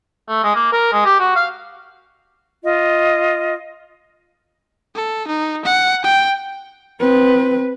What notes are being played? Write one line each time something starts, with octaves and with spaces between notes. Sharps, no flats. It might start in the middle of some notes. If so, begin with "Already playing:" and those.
A3
G#3
A#3
A#4
G#3
G4
F#4
F5
F4 D#5
A4
D#4
F#5
G5
C4 B4